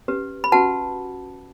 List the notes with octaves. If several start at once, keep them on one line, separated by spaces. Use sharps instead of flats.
C#4 G4 B4
B5
C#4 F#4 B4 F#5 A5